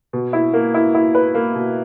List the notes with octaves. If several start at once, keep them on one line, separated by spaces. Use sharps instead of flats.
B2
E4
A#3
E4
E4
B4
A#3
B2